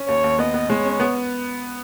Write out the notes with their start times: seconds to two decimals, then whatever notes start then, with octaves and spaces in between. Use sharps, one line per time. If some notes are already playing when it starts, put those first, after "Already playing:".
Already playing: C#4
0.08 D#2 C#5
0.24 D#2
0.39 B3 D#5
0.54 B3
0.69 G#3 C#5
0.85 C#4
1.00 B3